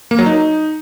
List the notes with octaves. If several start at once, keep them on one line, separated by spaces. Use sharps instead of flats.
A#3
F#3
D#4